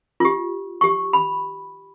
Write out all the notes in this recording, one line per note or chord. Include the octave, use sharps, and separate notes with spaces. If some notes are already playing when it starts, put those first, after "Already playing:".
F4 G4
G4 C#6
B5